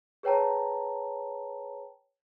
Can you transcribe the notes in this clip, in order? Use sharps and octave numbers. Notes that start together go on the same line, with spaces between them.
G#4 B4 C#5 G5 A5 A#5